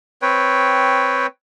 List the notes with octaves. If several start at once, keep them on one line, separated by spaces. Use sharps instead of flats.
C4 B4 C#5 G5